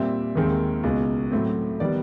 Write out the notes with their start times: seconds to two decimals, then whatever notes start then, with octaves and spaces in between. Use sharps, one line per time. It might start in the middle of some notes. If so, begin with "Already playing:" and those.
Already playing: A#2 G3 C4 E5
0.35 D#2 D#3 G#3 C4
0.84 C#2 B2 G#3
1.31 A2 F#3 A3 C4
1.80 D#3 G3 B3 D5